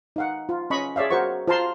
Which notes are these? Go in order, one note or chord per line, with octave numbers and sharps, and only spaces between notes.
D#4 F5 F#5
F4
C#4 D#5 B5 C#6
G#4 C#5 D5 E5 F5
F#4 A#4 C5 F#5 C#6
F4 C5 F5 A5 A#5 C6